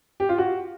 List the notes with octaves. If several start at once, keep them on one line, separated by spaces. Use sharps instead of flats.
G4
F4
F#4